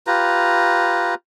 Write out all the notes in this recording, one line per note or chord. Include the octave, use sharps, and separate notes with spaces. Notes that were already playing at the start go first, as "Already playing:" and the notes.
F4 G4 B4 A#5